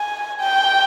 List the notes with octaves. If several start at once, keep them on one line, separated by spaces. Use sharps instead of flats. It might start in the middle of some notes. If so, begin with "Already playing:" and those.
Already playing: G#5
G5